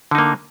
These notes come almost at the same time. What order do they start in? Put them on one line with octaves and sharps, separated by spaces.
D3 D#4 A#3